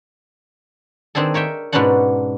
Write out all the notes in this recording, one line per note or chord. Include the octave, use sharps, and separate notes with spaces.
D#3 C4 D4 G#4 A4
A#4 C#5 E5 G5
G#2 B2 B3 C#4 D4 F#5